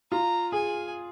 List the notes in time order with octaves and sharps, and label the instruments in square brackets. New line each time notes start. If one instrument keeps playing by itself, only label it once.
[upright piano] F4 [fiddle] A#5
[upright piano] G#4 [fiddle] G#5